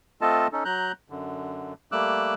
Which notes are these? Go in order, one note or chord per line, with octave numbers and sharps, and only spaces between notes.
A3 C4 F4 A4 D#5 A5
C#4 D#4 A4
F#3 A#5 F#6 G6
F#2 D3
G3 A3 A#3 D6 E6 F#6